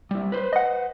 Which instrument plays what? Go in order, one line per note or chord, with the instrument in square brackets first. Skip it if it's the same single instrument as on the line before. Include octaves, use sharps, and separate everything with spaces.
[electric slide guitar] G3 E4
B4 C5
[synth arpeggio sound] D#5 F#5